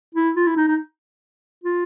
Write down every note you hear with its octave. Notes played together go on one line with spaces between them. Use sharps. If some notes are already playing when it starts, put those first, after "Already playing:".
E4
F4
E4
D#4
D#4
F4